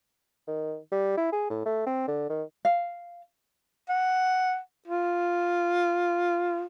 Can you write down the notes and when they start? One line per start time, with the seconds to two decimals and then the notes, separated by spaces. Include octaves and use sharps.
0.48 D#3
0.92 G3
1.18 E4
1.33 G#4
1.50 A2
1.66 A3
1.87 C4
2.08 D3
2.30 D#3
2.65 F5
3.89 F#5
4.88 F4